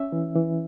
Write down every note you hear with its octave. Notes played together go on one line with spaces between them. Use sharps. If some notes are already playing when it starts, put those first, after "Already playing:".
Already playing: C#4 E5
E3
E3